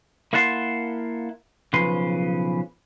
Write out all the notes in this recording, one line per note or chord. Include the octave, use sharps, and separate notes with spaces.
A#3 E4 F#5 A5 C6
B1 C#3 F3 B4 C6